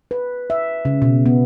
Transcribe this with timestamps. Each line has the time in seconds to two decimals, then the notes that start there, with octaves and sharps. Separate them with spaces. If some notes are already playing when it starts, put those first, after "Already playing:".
0.11 B4
0.50 E5
0.85 C#3
1.02 B2
1.26 B3